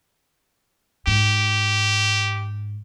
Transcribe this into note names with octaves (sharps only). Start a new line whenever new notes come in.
G#2 G4